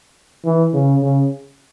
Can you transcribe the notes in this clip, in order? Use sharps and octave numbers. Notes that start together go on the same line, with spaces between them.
E3
C#3
C#3